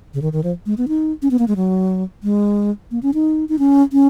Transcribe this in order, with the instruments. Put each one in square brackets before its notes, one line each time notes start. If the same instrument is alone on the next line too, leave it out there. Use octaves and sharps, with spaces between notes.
[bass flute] C#3
D#3
D#3
F3
G#3
B3
D#4
C#4
B3
A#3
G#3
F#3
G#3
A#3
C#4
D#4
D#4
C#4
C#4